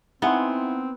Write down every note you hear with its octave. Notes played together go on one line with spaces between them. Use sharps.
B3 C4 D#4 E4 F#5 G#5 C6